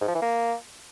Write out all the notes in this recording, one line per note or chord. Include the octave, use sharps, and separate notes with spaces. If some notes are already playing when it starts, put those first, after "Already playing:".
G#2
F3
E3
A#3